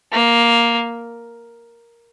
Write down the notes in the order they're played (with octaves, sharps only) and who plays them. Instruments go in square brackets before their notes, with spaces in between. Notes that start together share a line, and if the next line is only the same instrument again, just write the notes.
[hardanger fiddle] A#3